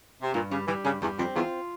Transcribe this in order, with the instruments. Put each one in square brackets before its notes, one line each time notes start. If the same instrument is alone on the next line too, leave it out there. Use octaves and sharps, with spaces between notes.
[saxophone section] C3
[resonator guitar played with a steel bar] G2 [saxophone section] A#2
[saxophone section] C#3 [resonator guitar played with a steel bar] G3
[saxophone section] E3 [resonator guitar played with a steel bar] G3
[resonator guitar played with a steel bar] G2 [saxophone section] C#3
[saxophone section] E2 [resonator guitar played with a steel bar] G3
[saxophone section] F2 [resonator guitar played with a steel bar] C4
[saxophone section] E2 [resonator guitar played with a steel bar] F4